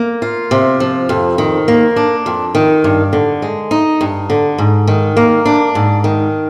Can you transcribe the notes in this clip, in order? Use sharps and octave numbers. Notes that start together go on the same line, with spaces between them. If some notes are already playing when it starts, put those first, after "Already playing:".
Already playing: A#3
F4
C3
F3
F2
D#3
A#3
D4
F2
D#3
G2
D3
G#3
D#4
G2
D3
G#2
D#3
A#3
D4
G#2
D#3